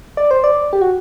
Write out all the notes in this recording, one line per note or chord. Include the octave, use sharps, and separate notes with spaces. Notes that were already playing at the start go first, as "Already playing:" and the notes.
D5
C5
D5
G4
F#4